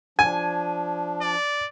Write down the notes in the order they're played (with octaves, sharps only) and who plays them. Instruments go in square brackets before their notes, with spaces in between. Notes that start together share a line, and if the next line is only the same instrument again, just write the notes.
[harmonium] F3 D4 [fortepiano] G#5
[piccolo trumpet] D5